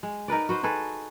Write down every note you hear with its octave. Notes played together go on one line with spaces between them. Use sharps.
G#3
D#4 A#4 B4 D5
F#4 B4 C5
D#4 G#4 A4 B4